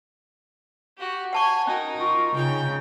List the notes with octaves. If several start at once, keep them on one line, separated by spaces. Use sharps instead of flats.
F#4 G4
C#5 F#5 G#5 A5 C#6
C#4 D#4 F#4 A#4
F4 C#6
C#3 D#4 G5 G6